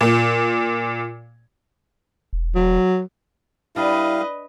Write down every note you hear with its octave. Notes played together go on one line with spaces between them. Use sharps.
A#2
E1
F#3
G3 D4 E4 B4 D#5 F5